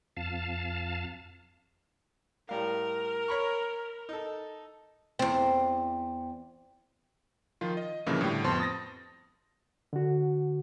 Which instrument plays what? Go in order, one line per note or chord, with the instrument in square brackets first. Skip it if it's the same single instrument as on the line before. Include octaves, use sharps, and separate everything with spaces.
[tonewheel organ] F2 F5 A5
[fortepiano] A2 G3 F5 [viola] A#4
[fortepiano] C#5 B5 C#6
D#4 A4
[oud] E2 C4
[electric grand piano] D#3 F3 F4
D#5
G2 A#2 C#3 E3 F3 A#3
A2 D3 G3 G4
F2 B3 C5 A5 C6
D#6 A6 A#6
[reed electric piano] D3 F#4